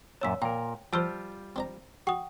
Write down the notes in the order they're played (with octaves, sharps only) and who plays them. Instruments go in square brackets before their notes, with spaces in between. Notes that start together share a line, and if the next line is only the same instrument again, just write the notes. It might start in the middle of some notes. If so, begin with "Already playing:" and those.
[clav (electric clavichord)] F#2 A#2 A5 [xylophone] C#5 E6 B6
[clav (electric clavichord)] A#2 A#4 [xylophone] G5 [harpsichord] A#5
[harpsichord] F3 C5 [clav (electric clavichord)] G3 F4 G4 [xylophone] A5 E6 F6
[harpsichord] C4 D4 A#5
[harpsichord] F#4 [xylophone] G5 D#6